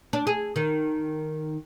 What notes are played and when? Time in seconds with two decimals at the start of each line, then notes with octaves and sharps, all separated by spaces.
0.13 D4
0.27 G#4
0.56 D#3